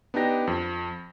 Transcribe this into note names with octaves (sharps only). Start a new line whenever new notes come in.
B3 D4 D#4 G4 A#6
F2